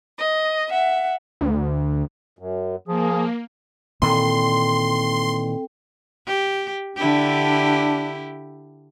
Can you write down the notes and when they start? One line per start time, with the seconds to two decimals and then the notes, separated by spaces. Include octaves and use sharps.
0.19 D#5
0.70 E5 F#5
1.41 D2
2.39 F#2
2.88 F3 A#3 G#4
4.02 A#2 D#3 E3 C4 A4 G5 C6
6.26 G4
6.96 D3 D4 E4 G4